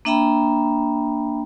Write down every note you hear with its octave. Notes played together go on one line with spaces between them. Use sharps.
A#3 D4 E5 G5 A#5 B5